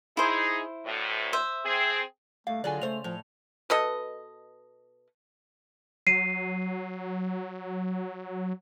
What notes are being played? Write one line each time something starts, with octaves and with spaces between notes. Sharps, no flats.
D#4 E4 G#4 C5
D2 A2
C5 E5
C4 G#4
G2 A3 F5
D3 F#3 G#3 F4 D5 G#5
C#3 A3 C5 F7
A2 F3
B2 B3 A4 D#5
F#3 C7 D#7